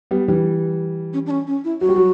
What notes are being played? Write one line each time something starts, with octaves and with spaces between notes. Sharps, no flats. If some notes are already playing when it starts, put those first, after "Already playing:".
G3 B3
E3 G3
C#4
D4
C#4
C#4
E4
F#3 F#4
G3
F#3